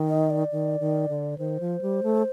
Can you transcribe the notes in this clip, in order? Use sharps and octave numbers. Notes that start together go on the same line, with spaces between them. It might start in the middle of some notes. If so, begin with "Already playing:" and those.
Already playing: D#3
D#5
D5
D#3
D#3
D3
D#3 C5
F3
G3
A3